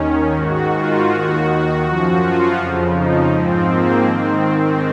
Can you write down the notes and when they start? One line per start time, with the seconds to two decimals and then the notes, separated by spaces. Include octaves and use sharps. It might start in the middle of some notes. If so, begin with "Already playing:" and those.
Already playing: D#2 D#3 C#4
0.35 G#2 D#3 F#4
0.73 F4
1.09 D#2 D#3 F#4
1.83 F#2 F3 F#4
2.20 F4
2.57 F2 C#3 F3
2.93 D#4
3.30 G#2 F3 C4
3.68 A#3
4.04 G#2 D#3 C4